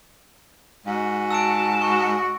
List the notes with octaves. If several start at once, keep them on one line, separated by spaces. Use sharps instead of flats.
G#2 F#4
A5 E6 D7
F#4 C#6